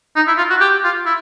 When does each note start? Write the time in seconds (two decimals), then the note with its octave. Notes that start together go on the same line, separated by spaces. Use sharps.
0.17 D#4
0.28 E4
0.38 F4
0.50 F#4
0.61 G4
0.84 F4
1.06 E4